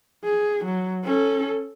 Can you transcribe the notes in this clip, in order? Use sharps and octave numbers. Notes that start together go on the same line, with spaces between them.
G#4
F#3
C#4 A4